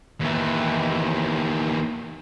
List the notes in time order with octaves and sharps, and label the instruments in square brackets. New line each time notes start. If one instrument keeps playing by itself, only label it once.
[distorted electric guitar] D#2 E3